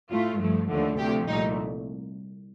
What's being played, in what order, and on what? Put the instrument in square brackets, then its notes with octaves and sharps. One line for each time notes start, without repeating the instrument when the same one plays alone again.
[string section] A2 A3 F4
G2 F3 A3
D#2 D3 F3 A3
D2 C3 F3 A3 G4
C2 A#2 A3 D#4